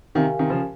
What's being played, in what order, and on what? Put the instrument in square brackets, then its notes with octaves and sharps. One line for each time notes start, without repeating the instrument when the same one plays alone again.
[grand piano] C3 D#3 [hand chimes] G4 A#4 F5 G#5
[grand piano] C3 D#3
C#3 F3